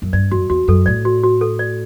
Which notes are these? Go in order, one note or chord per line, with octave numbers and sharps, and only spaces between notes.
F#2
G2 D5
F#2 F#4
E2 F#4
F#2 A4
A2 D5
F#4
F#4
A4
D5